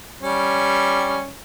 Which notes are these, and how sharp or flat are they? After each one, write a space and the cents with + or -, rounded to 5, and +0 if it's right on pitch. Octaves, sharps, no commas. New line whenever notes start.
G3 +0 C#4 +0